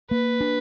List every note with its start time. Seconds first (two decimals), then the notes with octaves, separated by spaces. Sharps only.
0.10 A#3 B4
0.41 D4